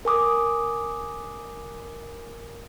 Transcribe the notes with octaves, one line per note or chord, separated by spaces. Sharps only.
A#4 G#5 D6 D#6